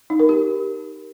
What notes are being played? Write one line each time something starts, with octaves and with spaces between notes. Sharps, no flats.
D#4
A#4
G4